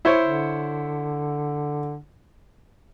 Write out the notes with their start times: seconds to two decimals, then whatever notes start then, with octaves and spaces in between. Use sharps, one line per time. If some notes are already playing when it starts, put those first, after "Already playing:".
0.05 E4 C5 C#5
0.23 D3